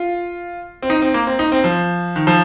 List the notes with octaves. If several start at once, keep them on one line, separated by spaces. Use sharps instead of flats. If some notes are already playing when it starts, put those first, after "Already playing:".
Already playing: F4
C4
D#4
C4
A#3
C4
D#4
C4
F3
D#3
F3